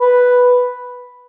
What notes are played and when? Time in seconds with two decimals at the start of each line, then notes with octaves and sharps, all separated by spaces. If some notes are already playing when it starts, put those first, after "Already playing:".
0.01 B4